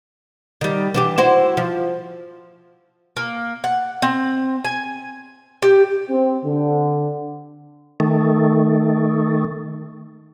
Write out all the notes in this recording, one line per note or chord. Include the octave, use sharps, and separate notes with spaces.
D#3 G3
E3 D4 G4
E4 F#4 C5
F3
A#3
F#5
C4
G#5
G4
C4
D3
D#3 A3